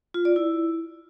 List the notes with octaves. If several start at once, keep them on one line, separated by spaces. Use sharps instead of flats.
F4
D5
E4